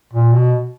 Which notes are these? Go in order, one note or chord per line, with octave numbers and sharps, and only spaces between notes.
A#2
B2